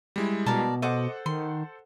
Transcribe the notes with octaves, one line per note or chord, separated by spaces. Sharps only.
G3 G#3 E4
B2 A#4 D5 A5
A4 C5 D#5 F#5 D6
D#3 C6